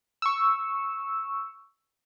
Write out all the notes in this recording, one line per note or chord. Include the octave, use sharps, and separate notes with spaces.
C#6 E6